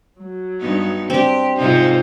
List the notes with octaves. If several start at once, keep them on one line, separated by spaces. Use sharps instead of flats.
F#3
G2 B3 D#4
C4 D4 G4
G#2 C3 D#4 F4 C5